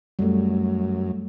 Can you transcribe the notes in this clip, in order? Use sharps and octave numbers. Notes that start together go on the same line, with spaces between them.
F#2 G3 A3